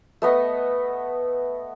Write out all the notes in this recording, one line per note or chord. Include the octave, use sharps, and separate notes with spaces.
A3 B3 D#5